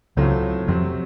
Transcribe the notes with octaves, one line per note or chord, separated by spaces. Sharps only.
C#2 A2 C#3 F#3 A3 C4 F4
F2 C3 F3 F#3 C4